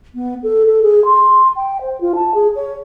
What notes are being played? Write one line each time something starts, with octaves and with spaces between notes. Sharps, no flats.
B3
A4
A4
G#4
C6
G5
C5
F4
A5
G#4
C#5